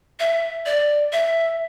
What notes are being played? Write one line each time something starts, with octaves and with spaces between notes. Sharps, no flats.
E5
D5
E5